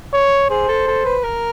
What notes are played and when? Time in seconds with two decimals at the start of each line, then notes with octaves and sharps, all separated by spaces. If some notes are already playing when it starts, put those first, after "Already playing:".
0.14 C#5
0.50 G#4 C5
0.68 A4
0.88 A4
1.05 B4
1.23 A#4